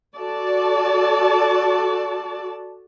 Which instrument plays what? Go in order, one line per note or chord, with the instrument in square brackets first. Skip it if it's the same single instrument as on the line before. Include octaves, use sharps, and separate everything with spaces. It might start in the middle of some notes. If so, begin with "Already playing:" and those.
[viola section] F#4 A4 D5 A5